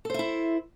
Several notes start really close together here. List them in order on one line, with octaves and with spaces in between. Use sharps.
A4 C5 E5 E4